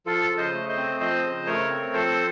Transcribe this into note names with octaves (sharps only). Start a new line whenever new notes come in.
F3 F4 A4
C#3
C5 D#5
A3
C5 D#5
C4
F3 C5 D#5
C#3
A3 A#4 C#5
C4
F3 A4 C5